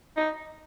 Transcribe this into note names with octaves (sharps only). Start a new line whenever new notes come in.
D#4